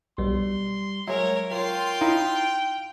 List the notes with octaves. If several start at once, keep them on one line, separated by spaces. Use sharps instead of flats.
B1 G3 C6
F#3 G#3 A#4 C#5 E5
F4 A#4 C#5 G5 C6
D#4 E4 F5